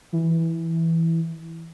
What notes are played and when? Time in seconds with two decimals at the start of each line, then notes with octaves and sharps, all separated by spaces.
0.12 E3